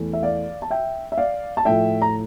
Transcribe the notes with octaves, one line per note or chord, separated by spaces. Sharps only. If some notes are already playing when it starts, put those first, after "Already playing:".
Already playing: E2 E3 A3
E5
D5 F5
A5
E5 G5
E5
D5 F5
A5
A2 F3 A3 E5 G5
A#5